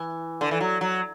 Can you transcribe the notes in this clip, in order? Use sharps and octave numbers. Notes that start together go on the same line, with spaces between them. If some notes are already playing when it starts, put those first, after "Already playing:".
Already playing: E3
D3
E3
F#3
F#3